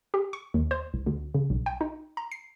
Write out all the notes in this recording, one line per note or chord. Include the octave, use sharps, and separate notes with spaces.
G4
C#6
D#2
C5
C2
D2
C#3
B1
G5
D#4
A#5
C7